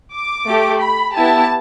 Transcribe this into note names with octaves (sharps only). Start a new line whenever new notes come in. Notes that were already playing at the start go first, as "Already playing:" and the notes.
D6
A3 G4
B5
B3 E4 G4 A5